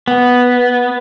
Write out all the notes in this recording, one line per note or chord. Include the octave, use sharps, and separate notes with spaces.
B3